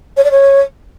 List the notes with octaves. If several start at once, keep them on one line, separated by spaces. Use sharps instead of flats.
C#5
D5
C#5